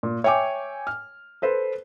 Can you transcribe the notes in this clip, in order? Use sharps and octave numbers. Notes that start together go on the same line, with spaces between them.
A#2
C#5 E5 G5 G#5 D6
F6
A4 B4 C5